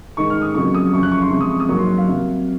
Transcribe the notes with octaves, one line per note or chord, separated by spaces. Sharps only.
G#2 D#3 G#3 C#6
F6
D#6
F2 C#3 F#3 A#3 C#6
D#6
F#2 C#3 F3 C#6
F#6
C#6
C6
C3 F3 G#3 C#6
D#6
C#6
D#6
G#2 F#3 A#3 C#6
C6
F5
C3 F#3 A#3